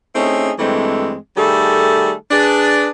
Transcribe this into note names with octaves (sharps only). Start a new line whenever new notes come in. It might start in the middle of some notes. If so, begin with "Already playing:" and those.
A3 C4 C#4 D#4 E4 G#4
G2 E3 G#3 A3 C4
D#3 G3 A3 G#4 A4
D4 G#4 B4